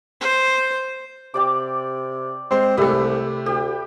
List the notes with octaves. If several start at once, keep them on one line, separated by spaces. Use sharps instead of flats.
C5
C3 G4 D5 D6
G#3 C4 C5
C2 C3 A3 G4 B4 E5
D2 G4